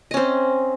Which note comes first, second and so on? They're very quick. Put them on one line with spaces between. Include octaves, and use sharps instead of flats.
D#5 C#4 C4